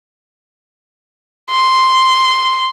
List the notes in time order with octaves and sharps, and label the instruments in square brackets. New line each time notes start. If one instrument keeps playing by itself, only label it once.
[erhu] C6